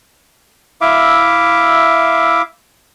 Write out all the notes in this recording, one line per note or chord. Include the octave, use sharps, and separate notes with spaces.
E4 E5 F5 D6